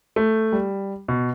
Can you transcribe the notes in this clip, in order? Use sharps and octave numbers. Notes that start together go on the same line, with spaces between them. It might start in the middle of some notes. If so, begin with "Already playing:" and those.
A3
G3
B2